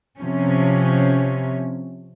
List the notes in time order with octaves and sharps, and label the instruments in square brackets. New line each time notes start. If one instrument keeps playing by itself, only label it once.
[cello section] C3 F3 C#4